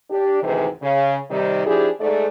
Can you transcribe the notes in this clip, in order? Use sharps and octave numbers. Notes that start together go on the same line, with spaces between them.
D4 G4
D2 G#2 C3 D#3 E3 G#3
C#3
C3 D#3 G3
F3 D4 E4 G4 G#4
G#2 A3 D5